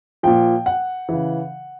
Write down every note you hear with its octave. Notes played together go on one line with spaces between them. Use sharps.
A#2 F3 G5
F#5
C#3 E3